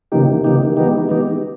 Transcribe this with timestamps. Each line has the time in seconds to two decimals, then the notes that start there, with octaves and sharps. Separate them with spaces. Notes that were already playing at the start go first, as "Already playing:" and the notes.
0.12 C#3 E3 A#3 D#4 G4
0.44 C#3 E3 A#3 D#4 G4
0.77 E3 G#3 B3 D#4 G4
1.09 E3 G#3 B3 D#4 G4